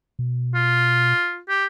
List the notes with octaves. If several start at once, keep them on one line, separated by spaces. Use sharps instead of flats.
B2
F4
G4